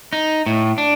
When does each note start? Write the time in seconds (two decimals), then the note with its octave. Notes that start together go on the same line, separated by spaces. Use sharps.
0.13 D#4
0.46 A2
0.78 D4